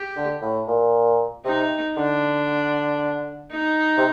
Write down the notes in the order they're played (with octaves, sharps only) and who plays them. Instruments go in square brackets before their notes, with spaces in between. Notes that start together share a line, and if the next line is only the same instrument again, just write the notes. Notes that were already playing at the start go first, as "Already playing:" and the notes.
Already playing: [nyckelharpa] G4
[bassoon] D3
A2
A#2
[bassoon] C3 [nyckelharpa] D#4
[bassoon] D3 [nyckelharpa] D4
[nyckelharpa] D#4
[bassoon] C3